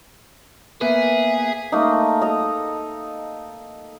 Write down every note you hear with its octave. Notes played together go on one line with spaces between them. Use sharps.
A#3 B3 G#4 B4 E5 G#5
A3 A#3 D#4
A4 D#5 A#5